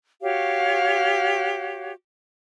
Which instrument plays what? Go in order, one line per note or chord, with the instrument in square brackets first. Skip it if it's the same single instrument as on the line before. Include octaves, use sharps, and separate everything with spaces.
[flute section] F#4 G4 C#5 F5